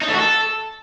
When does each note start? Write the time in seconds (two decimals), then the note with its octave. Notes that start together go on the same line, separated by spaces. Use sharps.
0.02 D#4
0.07 A3
0.13 F#4
0.19 A4